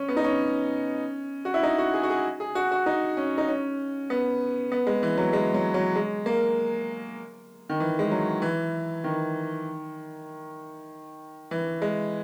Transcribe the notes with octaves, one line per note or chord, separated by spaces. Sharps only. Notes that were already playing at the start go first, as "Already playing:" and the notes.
Already playing: C#4
B3
D#4
C#4
F#4
E4
D#4
F#4
G#4
F#4
G#4
G#4
F#4
F#4
D#4
C#4
D#4
C#4
B3
B3
G#3
E3
F#3
G#3
F#3
F#3
G#3
A#3
D#3
E3
G#3
F#3
E3
D#3
E3
G#3